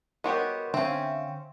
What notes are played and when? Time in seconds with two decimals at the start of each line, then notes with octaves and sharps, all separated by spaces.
0.24 B3 F#4 G4 A#4 C#5 D#5 C6
0.74 D3 C4 C#4 E5 F5 G5